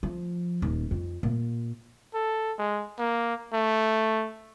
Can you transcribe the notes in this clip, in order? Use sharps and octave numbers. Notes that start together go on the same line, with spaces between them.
F3
D#1
F2
A#2
A4
G#3
A#3
A3